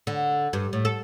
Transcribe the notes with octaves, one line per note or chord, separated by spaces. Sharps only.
D3
G2
A2
A4